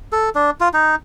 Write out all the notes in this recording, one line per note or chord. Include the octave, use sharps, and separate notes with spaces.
A4
D4
F4
D#4